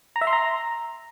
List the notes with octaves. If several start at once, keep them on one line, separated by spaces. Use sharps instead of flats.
A#5
E5
C6
A#5